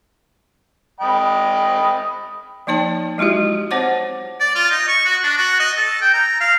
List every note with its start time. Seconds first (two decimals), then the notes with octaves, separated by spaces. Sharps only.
1.00 D#5 G5 B5
2.67 F3 A#3 D#4 C#5 A5
3.18 F#3 G#3 E4 F#4 G4
3.71 C4 C5 C#5 F#5 D6
4.40 D5
4.55 F4
4.71 D#5
4.88 C#6
5.05 F#4
5.23 D4
5.37 F#4
5.60 D#5
5.77 A4
6.01 G5
6.14 A#5
6.40 F5